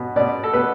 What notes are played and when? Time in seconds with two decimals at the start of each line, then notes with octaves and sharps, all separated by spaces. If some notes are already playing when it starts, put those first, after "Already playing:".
Already playing: B2 B3
0.16 B2 B3 D5
0.43 A4
0.53 B2 B3 B4